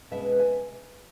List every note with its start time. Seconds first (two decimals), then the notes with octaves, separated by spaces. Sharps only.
0.11 B2 G#3 C#4 B4 E5
0.39 E5 G#5